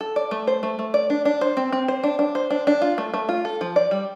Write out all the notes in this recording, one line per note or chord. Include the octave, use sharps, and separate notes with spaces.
A4
D5
A3
C5
A3
A3
D5
D4
D4
C5
C4
C4
C5
D4
D4
C5
D4
D4
F4
A3
A3
F4
A4
F3
D5
G3